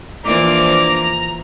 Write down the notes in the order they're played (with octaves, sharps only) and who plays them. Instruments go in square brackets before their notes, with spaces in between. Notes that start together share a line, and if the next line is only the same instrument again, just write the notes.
[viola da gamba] E3 F3 A#3 [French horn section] D4 C5 [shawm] A#5 [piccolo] D6